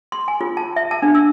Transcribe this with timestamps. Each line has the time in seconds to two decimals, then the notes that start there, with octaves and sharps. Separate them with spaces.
0.12 C6
0.28 G#5
0.41 F4
0.57 A5
0.76 E5
0.91 A5
1.02 D4
1.15 E6